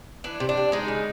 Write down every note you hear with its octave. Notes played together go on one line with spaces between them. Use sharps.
E3 D4
C3
D4
C3
G#3 D#4
C#3